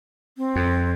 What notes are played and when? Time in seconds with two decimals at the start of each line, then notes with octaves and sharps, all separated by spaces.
0.38 C4
0.56 F2